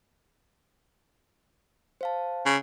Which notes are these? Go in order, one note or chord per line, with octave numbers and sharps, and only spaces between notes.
C5 F5 A5
C#3